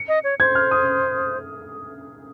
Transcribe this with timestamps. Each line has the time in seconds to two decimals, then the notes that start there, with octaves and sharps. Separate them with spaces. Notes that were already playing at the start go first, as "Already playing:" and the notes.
Already playing: C#7
0.08 D#5
0.24 C#5
0.40 C5 G#6
0.55 F6
0.71 D#6